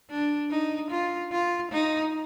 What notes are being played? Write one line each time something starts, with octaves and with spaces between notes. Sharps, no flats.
D4
D#4
F4
F4
D#4